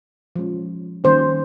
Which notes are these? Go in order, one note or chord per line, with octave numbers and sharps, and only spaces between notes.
F3 G#3 C#4
D#3 G3 A#3 C#4 C5